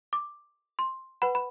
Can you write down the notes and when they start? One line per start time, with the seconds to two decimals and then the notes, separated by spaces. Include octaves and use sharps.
0.13 D6
0.79 C6
1.22 B4 F#5 B5
1.35 B5